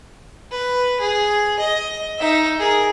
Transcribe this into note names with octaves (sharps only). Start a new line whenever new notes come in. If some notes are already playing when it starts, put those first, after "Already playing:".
B4
G#4
D#5
D#4 E5
G#4 A#4